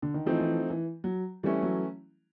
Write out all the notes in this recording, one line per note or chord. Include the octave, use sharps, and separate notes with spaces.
D3
D#3
E3 F3 A3 C4 D#4
E3
E3
F#3
E3 G3 A3 C#4 E4
F#3